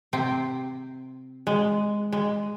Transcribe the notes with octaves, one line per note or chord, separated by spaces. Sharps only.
C3 C4
G#3
G#3